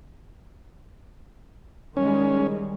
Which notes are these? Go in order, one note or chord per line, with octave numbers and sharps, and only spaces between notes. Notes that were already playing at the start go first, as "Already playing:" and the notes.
D#3 G3 G#3 C#4